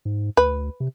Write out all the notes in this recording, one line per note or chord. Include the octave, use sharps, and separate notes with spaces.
G#2
D2 B4
C3